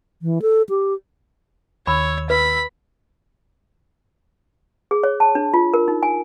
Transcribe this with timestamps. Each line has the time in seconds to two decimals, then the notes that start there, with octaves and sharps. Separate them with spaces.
0.22 E3
0.42 A4
0.69 G4
1.87 D#2 D#3 C#5 B5 E6
2.30 B4 B5
4.91 G#4
5.03 C#5
5.20 A5
5.35 D4
5.54 F4
5.74 A#4
5.88 D#4
6.03 G#5